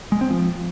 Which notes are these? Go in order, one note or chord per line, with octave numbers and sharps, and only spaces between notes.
G#3
C4
F3